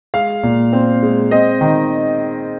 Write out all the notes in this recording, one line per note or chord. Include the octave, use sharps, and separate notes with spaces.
G#3 F5
A#2
C4
G#3
C4 D#5
D#3